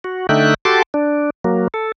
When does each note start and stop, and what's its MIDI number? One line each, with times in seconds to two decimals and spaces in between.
0.04 0.27 66
0.29 0.54 50
0.29 0.54 57
0.29 0.54 63
0.29 0.54 76
0.29 0.54 79
0.29 0.54 90
0.65 0.82 66
0.65 0.82 67
0.65 0.82 69
0.65 0.82 81
0.65 0.82 84
0.65 0.82 86
0.94 1.30 62
1.44 1.68 54
1.44 1.68 58
1.74 1.92 69